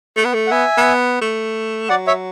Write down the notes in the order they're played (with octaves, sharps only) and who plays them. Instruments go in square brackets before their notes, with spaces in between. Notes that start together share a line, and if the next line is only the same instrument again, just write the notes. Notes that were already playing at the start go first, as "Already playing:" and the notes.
[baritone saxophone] A3
B3
A3
[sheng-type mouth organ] F#5
[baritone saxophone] B3 [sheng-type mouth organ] E5 G#5
[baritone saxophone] B3
A3
[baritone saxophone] F#3 [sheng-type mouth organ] D5 F#5
[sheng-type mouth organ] C#5 E5